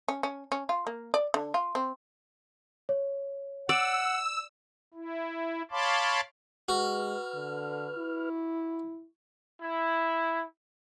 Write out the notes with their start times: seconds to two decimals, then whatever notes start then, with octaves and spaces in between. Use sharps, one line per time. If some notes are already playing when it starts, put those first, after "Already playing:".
0.08 C#4
0.23 C#4
0.52 C#4
0.69 F4
0.87 A#3
1.14 D5
1.34 D3
1.54 F4
1.75 C4
2.89 C#5
3.69 D5 F#5 E6
4.94 E4
5.71 C#5 F5 A5 B5 C6 D6
6.69 G#3 F#4 B4 F6
7.34 D3
7.97 E4
9.61 E4